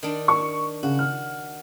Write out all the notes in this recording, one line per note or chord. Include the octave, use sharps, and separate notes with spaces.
D#3 D4
C#6
C#3 F#4
F6